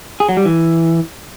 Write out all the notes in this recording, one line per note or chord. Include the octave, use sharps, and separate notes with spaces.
G#4
F#3
G3
E3